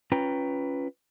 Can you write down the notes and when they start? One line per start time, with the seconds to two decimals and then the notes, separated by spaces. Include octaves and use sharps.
0.12 C#4 F4 B4 G5 A#5